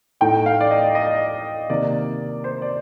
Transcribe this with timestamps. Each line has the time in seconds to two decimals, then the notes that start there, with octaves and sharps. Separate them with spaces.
0.21 A2 A3 D#4 G5
0.46 F5
0.60 D5
0.71 D#5
0.95 D#5
1.70 C3 D#3 A#3 D5
2.44 C5
2.62 D5